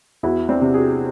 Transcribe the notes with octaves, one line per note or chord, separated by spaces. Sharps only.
E2 E4 F#4
C4 D4
C3
F#4 G#4